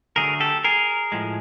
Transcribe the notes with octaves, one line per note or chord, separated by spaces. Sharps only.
D3 F#3 A3 G#4 A#4
G4 A4
G#4 A#4
A2 F3 G#3